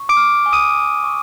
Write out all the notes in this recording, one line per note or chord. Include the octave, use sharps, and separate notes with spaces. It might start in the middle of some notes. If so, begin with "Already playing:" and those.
Already playing: C#6
D6 D7
F6
G#5
D#6 D#7
G#5
C#6